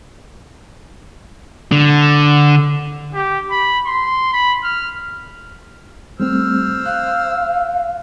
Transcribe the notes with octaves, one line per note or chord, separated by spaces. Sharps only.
D3
G4
B5
C6
B5
F6
G3 A3 C4 C5 E6 F6
F5 F#6